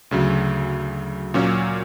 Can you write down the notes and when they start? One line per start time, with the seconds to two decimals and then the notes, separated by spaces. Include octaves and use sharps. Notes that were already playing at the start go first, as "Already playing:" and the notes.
0.11 D2 C#3 F#3
1.34 A#2 F#3 A#3 C#4